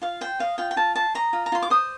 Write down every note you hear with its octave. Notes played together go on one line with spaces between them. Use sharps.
F4 F5
C5 G5
D#5 F5
F4 G5
G5
F4 A5
C5 A5
D#5 A#5
F4
A#5
F4 C6
D6
C5 D#6